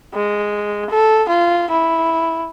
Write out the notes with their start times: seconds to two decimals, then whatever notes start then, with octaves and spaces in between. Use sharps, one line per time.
0.14 G#3
0.90 A4
1.28 F4
1.70 E4